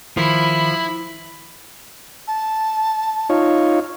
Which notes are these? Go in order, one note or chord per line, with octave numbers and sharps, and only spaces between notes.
D#3 F3 E4 B5
A5
D#4 F4 C#5